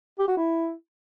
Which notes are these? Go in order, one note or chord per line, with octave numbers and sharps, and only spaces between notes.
G4
F#4
E4